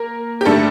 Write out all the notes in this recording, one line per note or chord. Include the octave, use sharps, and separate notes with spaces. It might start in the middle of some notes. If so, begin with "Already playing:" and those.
Already playing: A#3 A#4
G4
G2 D3 G3 A3 A4